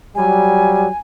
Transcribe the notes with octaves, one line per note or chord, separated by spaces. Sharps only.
F#3 G3 G#5